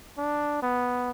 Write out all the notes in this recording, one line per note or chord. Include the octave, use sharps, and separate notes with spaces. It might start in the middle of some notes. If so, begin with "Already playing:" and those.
D4
B3